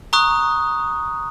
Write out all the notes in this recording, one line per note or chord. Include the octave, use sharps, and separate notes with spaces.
A#5 C#6 D#6 F#6